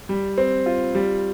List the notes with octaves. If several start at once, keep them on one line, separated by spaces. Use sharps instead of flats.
G3
C4
F4
G3